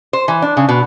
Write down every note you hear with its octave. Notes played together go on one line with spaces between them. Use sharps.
C5
E3
D4
C#3
B2